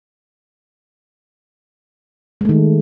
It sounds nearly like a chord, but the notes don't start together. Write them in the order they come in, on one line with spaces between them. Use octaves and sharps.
G#3 A3 D#3